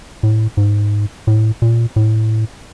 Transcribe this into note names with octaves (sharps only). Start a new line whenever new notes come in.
A2
G#2
A2
A#2
A2